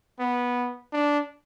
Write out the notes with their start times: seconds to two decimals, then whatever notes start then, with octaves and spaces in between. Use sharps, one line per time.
0.19 B3
0.93 D4